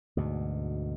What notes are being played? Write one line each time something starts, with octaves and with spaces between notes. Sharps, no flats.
D2 G#2 B2